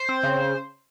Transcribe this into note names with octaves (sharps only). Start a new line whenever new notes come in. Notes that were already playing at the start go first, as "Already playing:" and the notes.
Already playing: C5
C4
C#3